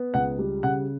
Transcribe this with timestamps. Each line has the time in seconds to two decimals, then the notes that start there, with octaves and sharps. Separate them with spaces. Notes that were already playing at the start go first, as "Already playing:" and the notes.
Already playing: B3
0.14 C#2 F#5
0.39 G3
0.63 C#3 F#5